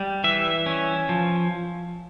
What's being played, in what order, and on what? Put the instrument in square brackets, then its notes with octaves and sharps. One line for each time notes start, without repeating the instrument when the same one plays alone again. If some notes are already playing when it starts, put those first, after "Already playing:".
Already playing: [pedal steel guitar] G3
E3 E5
C#4
F3